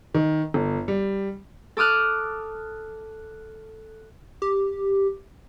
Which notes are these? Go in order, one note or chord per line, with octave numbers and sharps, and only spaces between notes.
D#3
G1
G3
A4 D6 D#6 F6 F#6
G4